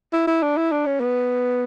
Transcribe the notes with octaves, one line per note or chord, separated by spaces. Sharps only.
E4
E4
D4
E4
D4
C#4
B3